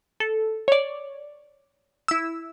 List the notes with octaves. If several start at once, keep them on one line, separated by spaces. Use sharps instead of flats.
A4
C#5 D5
E4 E6